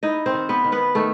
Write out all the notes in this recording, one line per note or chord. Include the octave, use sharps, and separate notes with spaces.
D#4 E4 D#5
C4 C5
D#3
B3 B4
D#3
B3 B4
D#3 A3 A4